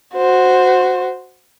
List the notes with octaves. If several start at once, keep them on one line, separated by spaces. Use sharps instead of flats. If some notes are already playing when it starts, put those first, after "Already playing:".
F#4 C5